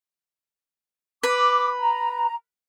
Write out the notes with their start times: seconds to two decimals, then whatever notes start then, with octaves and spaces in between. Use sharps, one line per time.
1.23 B4 D6
1.80 A#5